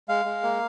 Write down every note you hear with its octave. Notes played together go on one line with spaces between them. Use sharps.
G#3 F5
G#3
A#3